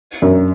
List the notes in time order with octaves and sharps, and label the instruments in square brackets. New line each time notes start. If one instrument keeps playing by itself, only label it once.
[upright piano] F#2